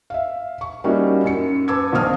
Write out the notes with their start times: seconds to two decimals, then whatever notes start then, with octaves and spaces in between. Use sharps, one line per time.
0.10 E5 F5
0.61 C#6
0.84 G3 A#3 C#4 D#4 E4 F#4
1.25 F#2 C#7
1.68 B4 A5 D6 E6 G#6
1.92 A#1 D#3 C4 C5 D#6 F6